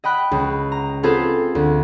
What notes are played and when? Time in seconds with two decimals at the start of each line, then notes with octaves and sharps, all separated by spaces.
0.04 D#5 G5 B5 F#6
0.31 C#2
0.72 A#5
1.03 C4 F4 G#4 A4 B4 C5
1.55 D2